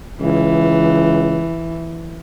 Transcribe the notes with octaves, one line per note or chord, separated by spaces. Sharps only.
C#2 E3